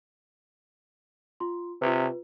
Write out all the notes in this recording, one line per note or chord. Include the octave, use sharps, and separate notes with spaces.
F4 C6
C3 F4 B4